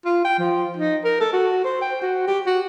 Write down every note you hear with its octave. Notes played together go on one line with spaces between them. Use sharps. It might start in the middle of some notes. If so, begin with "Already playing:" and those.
F4
G5
F3
D#4
A#4
A4
F#4
C5
G5
F#4
G4
F#4